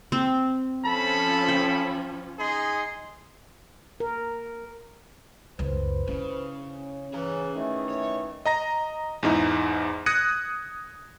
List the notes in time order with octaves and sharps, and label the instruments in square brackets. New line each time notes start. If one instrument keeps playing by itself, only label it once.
[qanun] C4
[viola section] F3 C#4 [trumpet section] A4 A5 B5
[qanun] G5
[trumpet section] D#4 G#4 C6
[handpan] A#4
[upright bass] C#2 F#2 [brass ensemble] B4 C5
[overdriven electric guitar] C#3 [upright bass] E4
[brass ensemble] C#4
[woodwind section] C#3 E3 [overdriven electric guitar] G#4 A#5
[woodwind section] D#3 E3 A3
[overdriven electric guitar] C#5
[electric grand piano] D#5 A#5 A#6
E2 G#2 D#4 E4
D#6 F#6 G#6 A#6 C#7 D#7